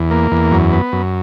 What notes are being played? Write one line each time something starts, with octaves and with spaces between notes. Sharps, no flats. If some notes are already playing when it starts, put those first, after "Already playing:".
Already playing: E2
A#3
E2
F#2
B3
F#2